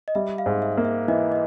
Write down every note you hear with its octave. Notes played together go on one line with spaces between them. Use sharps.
D#5
G3 E5
F5
G#2
E5
A#3
E5
E3 D#5
D#5